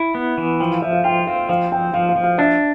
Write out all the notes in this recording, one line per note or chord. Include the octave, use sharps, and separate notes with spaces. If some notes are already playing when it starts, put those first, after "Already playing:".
Already playing: E4
B3
E3
F3 G5
F5
F3 E5
F5
F4 G5
C4 F5
F3 F5
C4 G5
F3 F5
F5
F3
F5
D4 E5